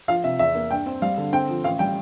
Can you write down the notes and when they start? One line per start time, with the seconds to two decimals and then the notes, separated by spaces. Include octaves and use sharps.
0.08 F3 F5
0.24 C3 E5
0.39 E2 E5
0.55 A#3
0.71 G2 G5
0.86 C4
1.02 G3 F5
1.18 D3
1.33 C4 G5
1.49 F3
1.64 A1 F5
1.79 G3 G5